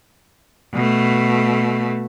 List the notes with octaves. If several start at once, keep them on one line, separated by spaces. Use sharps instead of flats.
B2 A3